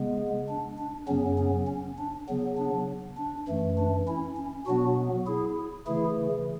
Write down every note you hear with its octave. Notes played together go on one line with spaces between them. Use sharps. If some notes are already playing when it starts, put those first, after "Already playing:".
Already playing: C#3 G#3 B3
D4
D4
F#2 C#3 F#3 B3 C#4
C#4
C#4
D4
C#3 F#3 B3
D4
D4
F#2 E3 A3
D4
C#4 E4
C#4
B2 F#3 B3 D4 F#4
E4 G#4
C#3 E3 A3 E4 G#4